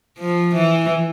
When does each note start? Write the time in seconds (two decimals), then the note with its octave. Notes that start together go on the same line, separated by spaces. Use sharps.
0.18 F3
0.55 E3